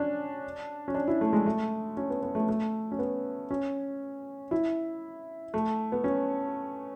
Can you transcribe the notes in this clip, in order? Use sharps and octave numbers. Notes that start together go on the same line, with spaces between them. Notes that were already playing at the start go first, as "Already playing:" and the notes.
Already playing: C#4 D4
C#4
D4
E4
A3
G#3
A3
C#4
B3
B3
A3
A3
C#4
B3
C#4
E4
A3
B3
C#4